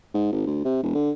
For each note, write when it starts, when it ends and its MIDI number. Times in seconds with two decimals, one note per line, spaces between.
0.14 0.30 44
0.32 0.44 32
0.47 0.61 38
0.65 0.81 48
0.83 0.90 28
0.95 1.10 50